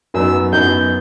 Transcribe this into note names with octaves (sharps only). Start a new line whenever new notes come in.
F#2 F#3 B3 D#4 E6
F#2 F#3 B3 D#4 G6